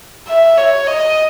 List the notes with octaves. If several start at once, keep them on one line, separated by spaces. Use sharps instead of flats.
E5
C#5
D#5